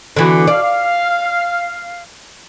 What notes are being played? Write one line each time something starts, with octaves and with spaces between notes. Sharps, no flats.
D3 E3 B3 D4 F#4
B2 D5 F5
F5